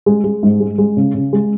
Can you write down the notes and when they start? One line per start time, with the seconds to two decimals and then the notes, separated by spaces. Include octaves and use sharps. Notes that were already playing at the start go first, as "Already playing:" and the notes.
0.06 G#3
0.24 G#3
0.43 G#2
0.60 G#3
0.78 G#3
0.97 C#3
1.15 C#3
1.33 G#3